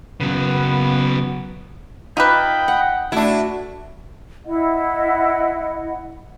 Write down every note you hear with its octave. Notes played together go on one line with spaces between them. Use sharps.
C#3 F#3 B3
D#4 F4 G4 B4 D#5 E5 G5 B5
F#5
A3 D4 E4 F#4
E4 D#5 F#5